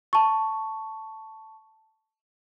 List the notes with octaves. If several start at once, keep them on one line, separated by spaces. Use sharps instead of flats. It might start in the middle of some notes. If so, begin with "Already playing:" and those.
A5 C#6